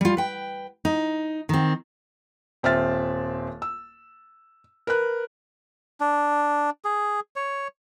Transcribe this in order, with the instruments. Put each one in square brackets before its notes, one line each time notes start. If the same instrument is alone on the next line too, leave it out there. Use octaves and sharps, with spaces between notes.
[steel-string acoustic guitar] G3 F4
B4 G5
D#4
D#3 C4
[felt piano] D#1 C4 E5 F6 A6
E6
A#4 B4 F#6
[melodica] D4
G#4
C#5